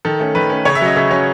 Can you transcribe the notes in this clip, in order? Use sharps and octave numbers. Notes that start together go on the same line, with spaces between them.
D#3 A4
A3 C#4
D#3 B4
A3 C#4
C#3 C#5
E5
F#3 C#4 D#5
C#3 E5
F#3 C#4